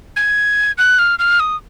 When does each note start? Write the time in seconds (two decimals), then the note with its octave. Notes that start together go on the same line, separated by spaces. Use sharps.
0.16 G#6
0.78 F#6
0.99 F6
1.19 F6
1.40 D#6